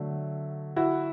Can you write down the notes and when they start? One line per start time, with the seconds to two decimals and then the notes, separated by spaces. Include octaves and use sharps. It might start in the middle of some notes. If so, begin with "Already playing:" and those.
Already playing: D3 F#3 A3
0.76 E4 F#4